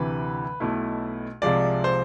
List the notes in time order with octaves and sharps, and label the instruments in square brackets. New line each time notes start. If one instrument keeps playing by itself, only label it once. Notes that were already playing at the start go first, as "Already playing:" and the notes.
Already playing: [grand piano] D2 C3 E3 B4
B1 B2 A3 E4
C2 C3 F3 G#3 D5
C5